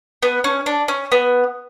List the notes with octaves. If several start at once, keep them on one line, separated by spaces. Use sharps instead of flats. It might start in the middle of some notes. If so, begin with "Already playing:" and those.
B3
C#4
D4
C#4
B3